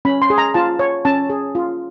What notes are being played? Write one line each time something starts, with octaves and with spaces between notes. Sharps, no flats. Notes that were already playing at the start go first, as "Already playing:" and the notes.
C#4 B5
C6
G#4
A#5
F4 A5
C#5
C#4 A5
G#4
F4